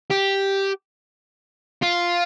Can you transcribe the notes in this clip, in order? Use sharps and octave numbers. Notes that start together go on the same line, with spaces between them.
G4
F4